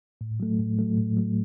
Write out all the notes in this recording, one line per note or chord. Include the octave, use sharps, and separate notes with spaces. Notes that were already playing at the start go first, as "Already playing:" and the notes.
A2
F#3 A3
A2
F#3 A3
A2
F#3 A3